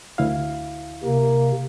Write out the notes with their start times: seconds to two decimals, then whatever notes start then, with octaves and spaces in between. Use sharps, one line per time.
0.18 D2 E4 F5
1.04 C3 A#3